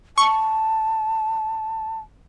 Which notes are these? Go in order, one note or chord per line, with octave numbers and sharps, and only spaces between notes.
A5 C#6